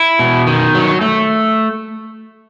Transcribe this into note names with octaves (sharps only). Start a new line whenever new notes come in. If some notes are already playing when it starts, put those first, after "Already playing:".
Already playing: E4
B2
D#3
F#3
A3